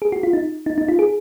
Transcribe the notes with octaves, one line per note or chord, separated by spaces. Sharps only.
G#4
F#4
F4
D#4
D#4
D#4
F4
G#4